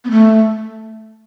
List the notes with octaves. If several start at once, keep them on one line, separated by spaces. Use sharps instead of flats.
B3
A3